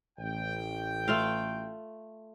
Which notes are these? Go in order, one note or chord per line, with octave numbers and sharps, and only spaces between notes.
A1 G5
A3 F4 F5